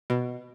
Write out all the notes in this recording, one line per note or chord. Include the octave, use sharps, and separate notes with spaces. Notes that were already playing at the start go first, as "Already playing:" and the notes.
B2